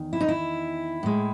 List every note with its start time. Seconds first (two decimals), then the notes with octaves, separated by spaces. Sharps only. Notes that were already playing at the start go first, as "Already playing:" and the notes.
Already playing: E2 D#3
0.13 E4
0.21 D#4
0.28 E4
1.03 A2 G#3